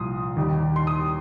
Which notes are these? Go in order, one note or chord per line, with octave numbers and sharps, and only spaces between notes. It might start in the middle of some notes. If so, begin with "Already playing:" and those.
Already playing: C2 A#2 F3 C6 D#6
D#2 D#3 G3 D#4
C6
D#6